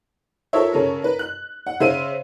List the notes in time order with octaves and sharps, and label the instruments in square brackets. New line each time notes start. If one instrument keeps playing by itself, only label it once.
[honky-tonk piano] F4 A4 A#4 C5 C#5 E5
C#3 C#4 A4 A#4
A#4 B4
F#6
F#5
C#3 C5 E5 F5 D#7